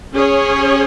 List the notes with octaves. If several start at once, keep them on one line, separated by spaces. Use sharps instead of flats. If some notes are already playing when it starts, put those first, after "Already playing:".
C#4 G#4 C#5